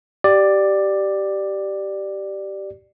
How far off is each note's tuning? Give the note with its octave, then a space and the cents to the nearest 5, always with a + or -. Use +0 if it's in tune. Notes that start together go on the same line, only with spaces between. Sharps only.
G4 -15 D5 +10